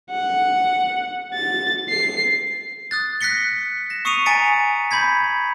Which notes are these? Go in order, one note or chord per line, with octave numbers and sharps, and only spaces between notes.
F#5
A6
C7
D#6 F#6 A6
F#6 A#6 B6 C#7 G7
A#6 E7
C#6 D#6 C7 C#7 D#7 F7
G#5 A#5 A6 B6 C#7 D7
B5 G6 G#6 B6